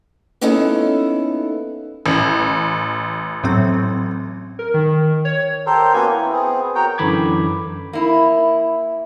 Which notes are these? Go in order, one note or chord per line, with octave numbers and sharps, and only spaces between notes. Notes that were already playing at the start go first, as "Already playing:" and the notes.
A#3 B3 C#4 D#4 E4 A4
A1
A2 F#3 C4
A#4
D#3
C#5
G4 A4 A#4 C5
A#3 B3 C#4 F#4 G#5
E4
B3 C4 G#4
F#4 A#4 C#5 G5
F#2 D3 E3 B5 D6 G#6
A#3 E4